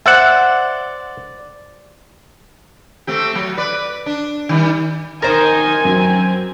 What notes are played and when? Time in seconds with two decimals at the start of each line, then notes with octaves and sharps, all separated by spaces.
0.06 C5 D5 E5 F#5
3.07 A3 C4 G4
3.35 F#3
3.57 B4 D5
4.06 D4
4.49 D#3 G3
5.22 D#3 D#4 A#4 C5 G#5 A6
5.85 F#2 F#3 C4